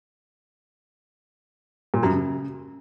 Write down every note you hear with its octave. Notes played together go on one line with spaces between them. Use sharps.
A#2
F#2
C#3